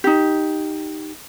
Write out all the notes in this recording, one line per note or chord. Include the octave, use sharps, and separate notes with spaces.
D#4 G4